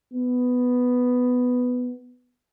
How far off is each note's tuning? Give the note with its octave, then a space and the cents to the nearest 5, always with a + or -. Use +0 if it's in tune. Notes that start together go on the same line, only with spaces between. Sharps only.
B3 +5